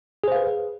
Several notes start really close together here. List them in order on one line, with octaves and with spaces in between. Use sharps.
G#4 C5 F5 B4